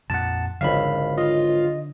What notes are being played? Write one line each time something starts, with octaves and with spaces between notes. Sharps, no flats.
F2 A#2 F#5 A5
G#1 C#2 D3 D#3 F3 E5 F5 B5
F4 D#5